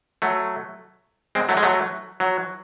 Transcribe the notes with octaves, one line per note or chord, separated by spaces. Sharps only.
F#3 A3
G#3 C4
F#3 A3
G#3
F#3 A3
F#3